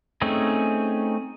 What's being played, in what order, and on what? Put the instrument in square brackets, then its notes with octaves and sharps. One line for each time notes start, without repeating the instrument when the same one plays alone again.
[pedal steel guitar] A3 C4 C#4 D#4 G#4